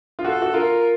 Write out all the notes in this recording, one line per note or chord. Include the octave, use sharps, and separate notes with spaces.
F4
F#4 A4
F#4
F4 A#4